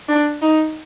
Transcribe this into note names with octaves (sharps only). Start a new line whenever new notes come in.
D4
D#4